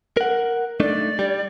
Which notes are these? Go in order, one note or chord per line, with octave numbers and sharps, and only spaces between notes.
A#4 F#5
A3 D4 D#4 D5
G3